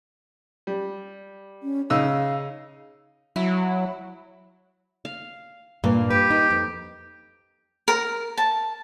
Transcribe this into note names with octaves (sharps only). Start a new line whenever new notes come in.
G3
C#4
C#3 D#4 F5 E6
F#3 E4
F5
G2 A#2 A#3
G4 B4
D#4
F2
A#4
A5